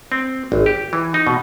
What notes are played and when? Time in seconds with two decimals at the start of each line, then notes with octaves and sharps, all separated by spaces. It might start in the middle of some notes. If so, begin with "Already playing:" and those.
0.12 C4
0.52 G#1
0.66 G4
0.93 E3
1.14 D#4
1.27 B2